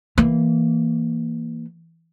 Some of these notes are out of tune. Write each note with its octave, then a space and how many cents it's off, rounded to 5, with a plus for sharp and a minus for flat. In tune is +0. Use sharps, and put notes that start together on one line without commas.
E3 +0 A#3 -5